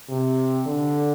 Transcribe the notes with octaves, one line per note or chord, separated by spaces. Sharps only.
C3
D3